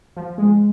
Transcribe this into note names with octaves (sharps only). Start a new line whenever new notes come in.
F3
G#3